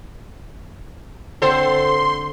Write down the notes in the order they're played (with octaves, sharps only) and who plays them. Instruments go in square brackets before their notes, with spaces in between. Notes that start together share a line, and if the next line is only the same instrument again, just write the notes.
[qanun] D3 C4 C#6 [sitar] A4 C5 [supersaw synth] C6